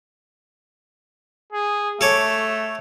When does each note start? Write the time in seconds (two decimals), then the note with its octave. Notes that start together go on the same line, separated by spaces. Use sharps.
1.52 G#4
2.01 A3 A4 C#5 D6